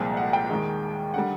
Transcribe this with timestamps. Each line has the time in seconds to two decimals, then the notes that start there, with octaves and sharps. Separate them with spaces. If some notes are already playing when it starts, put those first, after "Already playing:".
Already playing: C2 A#2 F3 G#3 G5
0.17 F#5
0.33 G5
0.49 D#2 D#3 G#3
1.14 D3 G3 F#5